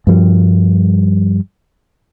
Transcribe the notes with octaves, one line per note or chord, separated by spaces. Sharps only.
G2 F3 G3